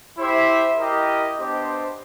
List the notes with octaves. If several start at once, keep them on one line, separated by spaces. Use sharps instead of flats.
E4 G4 C5 E5
E4 G4 A#4 D#5
B3 D4 G4 C5 D#5